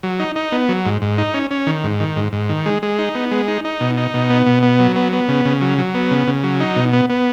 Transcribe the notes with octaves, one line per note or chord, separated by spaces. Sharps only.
F#3
D#4
D#4
B3
F#3
G#2
G#2
D#4
C#4
C#4
D#3
G#2
D#3
G#2
G#2
D#3
G#3
G#3
D#4
B3
G#3
D#4
D#4
B2
D#4
B2
B3
B2
B3
F#3
B3
B3
C#3
C#3
F#3
F#3
B3
C#3
C#3
F#3
D#4
B2
B3
B3